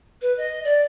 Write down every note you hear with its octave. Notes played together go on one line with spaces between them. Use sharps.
B4
D#5
D5